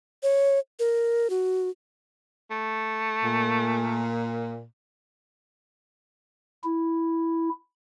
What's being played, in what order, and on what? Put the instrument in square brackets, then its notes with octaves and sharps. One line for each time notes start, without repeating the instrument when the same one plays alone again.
[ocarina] C#5
A#4
F#4
[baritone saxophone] A3
[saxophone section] A#2
[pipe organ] E4